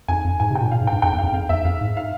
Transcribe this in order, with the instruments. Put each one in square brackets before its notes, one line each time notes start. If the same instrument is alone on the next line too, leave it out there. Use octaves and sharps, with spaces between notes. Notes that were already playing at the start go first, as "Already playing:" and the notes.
[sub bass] F2 [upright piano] G#5
[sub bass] F2
[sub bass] G#2 [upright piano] G#5
[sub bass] C3
[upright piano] G5
[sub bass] A#2
[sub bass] A#2 [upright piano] F5
[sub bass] G#2
[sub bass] G2 [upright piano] G5
[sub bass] F2 [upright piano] G5
[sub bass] E2
[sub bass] F2 [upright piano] F5
[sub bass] F2 [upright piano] F5
[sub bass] E2 [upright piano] E5
[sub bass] F2 [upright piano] F5
[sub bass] G#2
[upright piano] F5